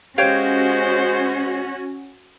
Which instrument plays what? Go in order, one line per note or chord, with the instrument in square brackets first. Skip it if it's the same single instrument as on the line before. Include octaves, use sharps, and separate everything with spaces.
[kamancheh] G#3 C5 [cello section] C#4 F#4 [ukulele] G4 C#5 F5